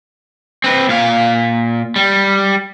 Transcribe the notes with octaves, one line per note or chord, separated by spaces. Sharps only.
C4 B4
A#2 F5
G3